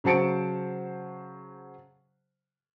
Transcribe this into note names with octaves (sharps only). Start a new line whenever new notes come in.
C#3 F#3 C5 A5 C#7 D7